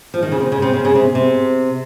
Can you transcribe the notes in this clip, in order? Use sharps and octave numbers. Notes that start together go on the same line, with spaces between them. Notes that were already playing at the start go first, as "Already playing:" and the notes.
F3
D#3
C#3
C3
C#3
C3
C#3
C#3
C3
C3